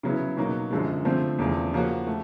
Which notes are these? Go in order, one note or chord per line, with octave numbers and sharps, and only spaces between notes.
C#3 F#3 B3 E4
B2 F#3 A#3 D#4
F#2 D3 F3 G#3
D3 F3 A3 C4
E2 C#3 F3 A3
C#3 F3 A#3 C#4 F#4
A3